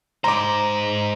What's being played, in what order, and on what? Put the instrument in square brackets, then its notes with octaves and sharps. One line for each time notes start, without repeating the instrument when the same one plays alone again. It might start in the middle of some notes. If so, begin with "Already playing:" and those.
[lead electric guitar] G#2 C5 [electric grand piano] A#5 D6